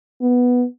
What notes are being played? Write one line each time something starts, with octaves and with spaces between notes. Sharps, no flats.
B3